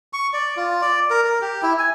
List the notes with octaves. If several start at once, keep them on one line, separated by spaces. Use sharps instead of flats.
C#6
D5
F4
D5
A#4
A#4
G4
E4
G#5